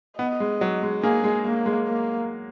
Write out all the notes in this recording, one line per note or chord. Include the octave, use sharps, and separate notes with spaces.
B3 D#5
G#3
F#3
G#3
A#3 G#4
G#3
G#3 A#3
G#3
A#3